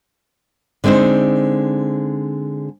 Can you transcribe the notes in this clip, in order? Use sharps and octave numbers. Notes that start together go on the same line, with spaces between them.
D3 G#3 C4 D#4 C5